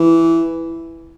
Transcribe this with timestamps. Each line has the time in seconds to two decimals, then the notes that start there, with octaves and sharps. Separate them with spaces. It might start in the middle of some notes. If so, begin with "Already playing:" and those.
Already playing: E3